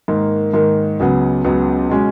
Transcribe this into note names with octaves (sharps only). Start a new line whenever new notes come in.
G#2 D#3 A#3
G#2 D#3 A#3
C#2 C#3 F#3 B3
C#2 C#3 F#3 B3
B2 G#3 C#4